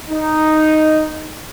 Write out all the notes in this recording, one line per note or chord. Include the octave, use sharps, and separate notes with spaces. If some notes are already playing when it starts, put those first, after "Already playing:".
D#4